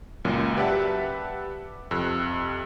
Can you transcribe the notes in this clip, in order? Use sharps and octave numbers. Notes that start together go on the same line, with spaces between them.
C#2 F#2 A#2 F#3
G4 B4 D5 E5 F#5 A5
F2 C3 E6 F#6